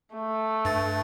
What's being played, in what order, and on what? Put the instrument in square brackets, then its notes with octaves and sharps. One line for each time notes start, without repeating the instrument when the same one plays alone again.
[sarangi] A3
[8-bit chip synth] G2 A6